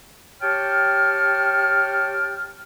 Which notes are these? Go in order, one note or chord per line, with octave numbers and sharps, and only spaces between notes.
G4 C#5 G5 A5 F6